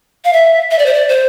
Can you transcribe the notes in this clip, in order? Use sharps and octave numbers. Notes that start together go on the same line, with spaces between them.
F5
E5
E5
D5
C5
D5
C5